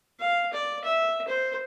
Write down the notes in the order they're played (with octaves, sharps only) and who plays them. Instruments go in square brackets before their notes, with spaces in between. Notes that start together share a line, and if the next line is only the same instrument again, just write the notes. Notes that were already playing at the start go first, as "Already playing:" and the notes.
[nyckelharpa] F5
D5
E5
C5